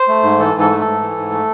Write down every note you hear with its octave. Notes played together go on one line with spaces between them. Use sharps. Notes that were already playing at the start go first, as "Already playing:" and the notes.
Already playing: C5
A3
G#2
E3 A4
G#2
A4
A3
A4
G#2
E3
G#2
A3